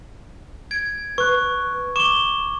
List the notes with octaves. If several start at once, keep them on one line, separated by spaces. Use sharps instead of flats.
G#6 D7
B4 C#6 F#6
C#6 D6 E7 G7